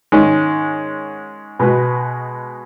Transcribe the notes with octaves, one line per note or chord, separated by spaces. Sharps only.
G#2 D#3 G#3 C#4
B2 G#3 B3 F#4 B4